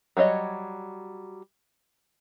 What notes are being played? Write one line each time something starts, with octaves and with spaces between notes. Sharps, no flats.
F#3 G3 C#5 D#5